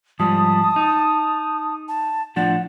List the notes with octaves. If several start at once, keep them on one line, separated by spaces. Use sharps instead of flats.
G#2 F3 G3 A5 D#6
D#4
A5
A2 F3 D4 F#5